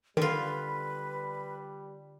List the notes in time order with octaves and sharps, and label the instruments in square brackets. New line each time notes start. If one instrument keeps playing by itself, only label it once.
[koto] D3 F4 [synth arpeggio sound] D#3 [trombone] G3 [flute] B4